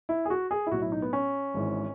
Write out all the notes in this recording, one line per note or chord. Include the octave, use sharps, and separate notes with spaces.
E4
G#4
F#4
G#4
E4
B1 A2 F#3 F#4
E4
D#4
B3
C#4
G#1 G#2 E3